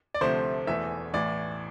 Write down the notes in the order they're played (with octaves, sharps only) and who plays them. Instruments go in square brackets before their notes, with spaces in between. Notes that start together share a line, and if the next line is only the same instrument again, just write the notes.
[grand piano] D5
D2 C3 F3 A3 C5
E1 E2 E3 A3 E5
A1 A2 E3 D5